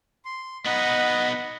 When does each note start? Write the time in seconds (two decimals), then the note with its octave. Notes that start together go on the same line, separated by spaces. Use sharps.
0.25 C6
0.65 B3 D#4 D#5 F#5 B5